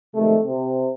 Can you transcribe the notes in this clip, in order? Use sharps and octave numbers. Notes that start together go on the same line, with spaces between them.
C3 D#3 F3 G#3 A3
C3